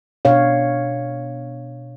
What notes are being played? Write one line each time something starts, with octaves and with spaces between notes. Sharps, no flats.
B2 D4 C#5 F5